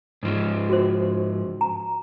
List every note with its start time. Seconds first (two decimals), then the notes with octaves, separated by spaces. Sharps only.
0.23 G#2 F3
0.69 F#4 C5
1.61 A#5